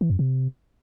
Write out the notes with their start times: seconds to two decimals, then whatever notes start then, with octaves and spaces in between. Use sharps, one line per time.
0.01 E3
0.10 F#2
0.19 C3